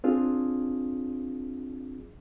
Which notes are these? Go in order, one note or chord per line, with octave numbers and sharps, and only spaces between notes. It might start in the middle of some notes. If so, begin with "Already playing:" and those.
C4 D4 F4 G#4